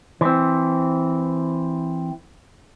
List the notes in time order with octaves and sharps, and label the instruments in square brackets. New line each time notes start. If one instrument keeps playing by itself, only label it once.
[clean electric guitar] E3 C4